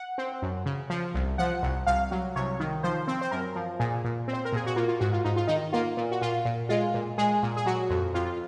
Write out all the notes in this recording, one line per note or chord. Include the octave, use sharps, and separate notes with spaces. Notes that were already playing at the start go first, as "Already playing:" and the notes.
Already playing: F#5
C4
F#2
C#3
F3
C2
F3 F#5
C2
C2 F5
F#3
C2 C#5
D#3
F3 C5
C4
C5
F#2 A#4
F3
A#2 G#4
A#2
C4
C5
A#4
A#2 G#4
F#4
A#3 F4
F4
G#2 F#4
F4
G#2 D#4
F4
D#3 D#4
A#3 F4
A#2
F#4
A#2 F4
A#2
G#3 F4
A#2
G#3 G#4
A#2
G#4
F#3 F#4
F2
F2 F4